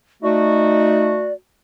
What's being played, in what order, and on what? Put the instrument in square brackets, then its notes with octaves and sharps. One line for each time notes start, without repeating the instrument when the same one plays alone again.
[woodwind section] A3 F#4 [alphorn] D#4 [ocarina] D5